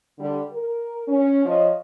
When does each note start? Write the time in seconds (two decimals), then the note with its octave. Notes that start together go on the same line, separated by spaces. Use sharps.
0.19 D3 G3
0.52 A#4
1.08 C#4
1.45 F3 C#5 D#5